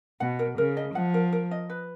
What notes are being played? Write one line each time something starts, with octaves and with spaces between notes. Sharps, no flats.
B2 F#5
A#4
C#3 A#4
D#5
F3 F#5
A#4
A#4
D#5
B4